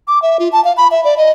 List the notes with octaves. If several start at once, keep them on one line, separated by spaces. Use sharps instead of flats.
D6
E5
F4
A5
F5
B5
E5
D5
D#5